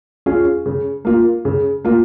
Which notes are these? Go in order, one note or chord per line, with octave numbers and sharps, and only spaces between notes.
C#4 F4 G#4
C#3
A#3 F4
C#3
A#3 F4